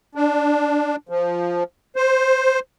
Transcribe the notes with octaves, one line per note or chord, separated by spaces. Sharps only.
D4
F3
C5